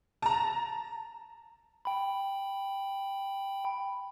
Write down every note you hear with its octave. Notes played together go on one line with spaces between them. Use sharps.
A5 A#5
G5 B5